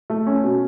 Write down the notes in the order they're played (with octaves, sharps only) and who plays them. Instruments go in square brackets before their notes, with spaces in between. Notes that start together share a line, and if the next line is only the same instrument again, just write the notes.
[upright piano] A3
C#4
B2